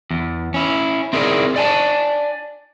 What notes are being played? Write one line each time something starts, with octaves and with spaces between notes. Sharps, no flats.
E2
C#4 E4
C4 E4 G#4 A#4 C5 D5
D5 G#5 A5